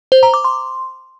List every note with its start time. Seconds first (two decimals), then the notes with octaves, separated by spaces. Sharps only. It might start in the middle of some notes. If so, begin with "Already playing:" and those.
0.12 C5
0.23 A#5
0.34 D6
0.45 C6